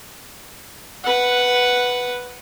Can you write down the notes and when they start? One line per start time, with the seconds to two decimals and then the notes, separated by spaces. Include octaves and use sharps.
1.04 B4 F#5